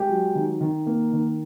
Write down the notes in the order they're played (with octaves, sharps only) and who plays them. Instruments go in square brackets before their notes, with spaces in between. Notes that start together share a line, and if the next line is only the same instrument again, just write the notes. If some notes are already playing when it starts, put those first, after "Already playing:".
Already playing: [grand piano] G#3 G4
F#3
D#3
D#3
A#3
D#3